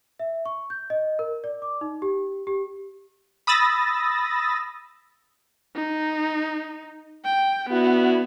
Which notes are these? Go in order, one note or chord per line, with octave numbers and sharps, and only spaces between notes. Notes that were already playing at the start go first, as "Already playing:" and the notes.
E5
C#6
G6
D#5
A#4
D5
D6
D#4
G4
G4
B5 D#6 E6 A6 A#6
D#4
G5
B3 D4 E4 F#4